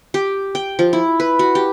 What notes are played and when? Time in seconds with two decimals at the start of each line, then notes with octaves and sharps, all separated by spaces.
0.14 G4
0.55 G5
0.79 F3
0.93 E4
1.20 B4
1.39 F#4
1.55 G4